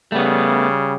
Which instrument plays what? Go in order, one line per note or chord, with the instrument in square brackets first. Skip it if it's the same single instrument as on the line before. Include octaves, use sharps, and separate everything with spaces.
[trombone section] C#3 G3 [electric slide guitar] A3 B3